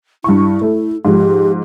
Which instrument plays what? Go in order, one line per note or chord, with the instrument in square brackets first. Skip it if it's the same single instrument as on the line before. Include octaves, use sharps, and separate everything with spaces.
[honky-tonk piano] G2 C#6 [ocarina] E4
[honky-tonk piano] A3
[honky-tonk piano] G#2 F3 [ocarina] G4